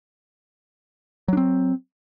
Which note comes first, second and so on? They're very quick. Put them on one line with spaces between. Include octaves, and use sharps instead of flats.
F#3 D4 C4